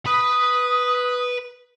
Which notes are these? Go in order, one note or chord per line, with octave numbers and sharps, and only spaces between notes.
B4 B5 D#6